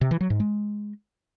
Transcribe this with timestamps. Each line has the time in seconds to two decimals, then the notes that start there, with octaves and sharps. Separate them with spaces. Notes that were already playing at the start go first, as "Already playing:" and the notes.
0.01 C3
0.11 E3
0.21 F#3
0.30 G#2
0.40 G#3